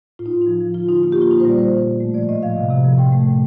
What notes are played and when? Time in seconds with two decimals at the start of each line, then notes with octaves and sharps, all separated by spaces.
0.19 A2 F4
0.26 D#4
0.33 A2
0.41 F3 D#4
0.61 F3
0.74 D3 F4
0.88 D3 D#4
1.03 A#3 F4
1.12 G4
1.17 A#3 F4
1.31 A#2 D#4
1.40 C5
1.45 G3 D5
1.59 G3 C5
1.72 A#2
1.87 A2
2.00 A3
2.14 F3 D5
2.29 A2 D#5
2.43 F3 F5
2.56 C3
2.70 C3
2.84 F3
2.98 A2 G5
3.12 A3
3.27 A2